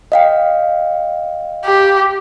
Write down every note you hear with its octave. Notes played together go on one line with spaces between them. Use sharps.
D#5 F5 G5
G4